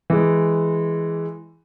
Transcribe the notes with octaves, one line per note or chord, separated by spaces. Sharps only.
E3 G#3